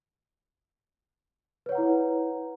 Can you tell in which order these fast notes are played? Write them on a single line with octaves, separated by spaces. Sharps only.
B4 C#5 F#5 A#5 E4